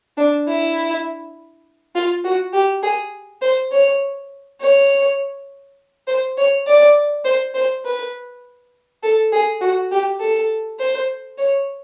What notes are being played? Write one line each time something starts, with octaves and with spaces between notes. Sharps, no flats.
D4
E4
F4
F#4
G4
G#4
C5
C#5
C#5
C5
C#5
D5
C5
C5
B4
A4
G#4
F#4
G4
A4
C5
C#5